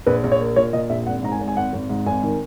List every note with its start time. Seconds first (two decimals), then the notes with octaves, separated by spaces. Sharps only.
0.06 A#1 B4
0.24 A#1
0.32 C#5
0.40 A#3
0.56 A#2 C#5
0.73 A#2 D#5
0.90 A#1 E5
1.06 G#1 F#5
1.23 G#2 A#5
1.32 G#5
1.40 G#1
1.48 G#5
1.57 G#1 F#5
1.73 G#1
1.90 G#2
2.06 G#1 G#5
2.23 D#3